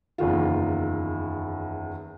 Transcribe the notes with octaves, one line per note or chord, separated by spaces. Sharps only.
F#1 E2 D#3 F4